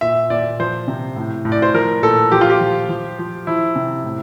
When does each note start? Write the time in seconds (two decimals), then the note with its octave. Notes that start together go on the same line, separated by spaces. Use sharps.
0.01 A#2 E5
0.30 A#2 D5
0.59 F3 C5
0.88 C3
1.16 A2
1.45 A2
1.52 D5
1.62 C5
1.74 F3 A#4
2.03 A#2 A4
2.32 F3 G4
2.41 F4
2.50 G4
2.61 F3
2.89 F3
3.19 F3
3.47 F3 E4
3.76 C3
4.04 A2